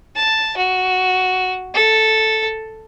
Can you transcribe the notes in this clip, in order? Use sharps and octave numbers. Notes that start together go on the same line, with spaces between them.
A5
F#4
A4